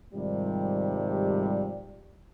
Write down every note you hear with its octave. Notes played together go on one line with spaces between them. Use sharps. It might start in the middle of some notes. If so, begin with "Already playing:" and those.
G#2 C3 D#3 F3 G3